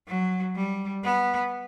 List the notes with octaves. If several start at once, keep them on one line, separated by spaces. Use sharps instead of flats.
F#3
G3
B3